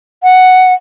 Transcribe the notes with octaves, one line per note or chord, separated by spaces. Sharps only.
F#5